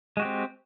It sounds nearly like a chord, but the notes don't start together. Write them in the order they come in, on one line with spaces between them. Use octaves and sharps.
G#3 F#4 G4 C4